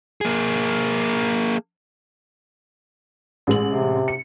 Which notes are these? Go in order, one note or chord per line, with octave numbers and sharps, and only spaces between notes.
A#3 G#4
A1 G#3 F#7
C3
C#7